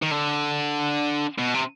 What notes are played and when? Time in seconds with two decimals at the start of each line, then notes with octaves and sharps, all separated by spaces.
0.02 D#3
0.11 D3
1.38 B2
1.54 C3